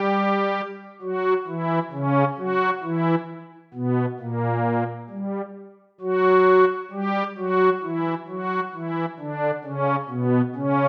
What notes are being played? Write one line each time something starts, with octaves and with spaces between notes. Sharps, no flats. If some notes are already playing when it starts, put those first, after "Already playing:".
Already playing: G3 G4
F#3 F#4
E3 E4
C#3 C#4
F#3 F#4
E3 E4
B2 B3
A#2 A#3
G3
F#3 F#4
G3 G4
F#3 F#4
E3 E4
F#3 F#4
E3 E4
D3 D4
C#3 C#4
B2 B3
C#3 C#4